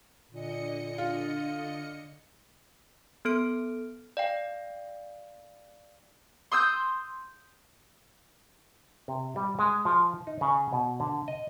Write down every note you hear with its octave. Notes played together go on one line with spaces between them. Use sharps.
A#2 D3 D#5 C#7
F4
B3 A4 F6 D7
D5 F5 G5
C6 D#6 E6 G6
C3
G3
G#3
F3
D#4
C#3
B2
D3
D#5